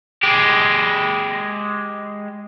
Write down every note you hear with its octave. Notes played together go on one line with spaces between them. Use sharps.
G#3 G4